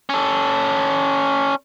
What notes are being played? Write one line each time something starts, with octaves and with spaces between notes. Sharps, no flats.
C#4 A4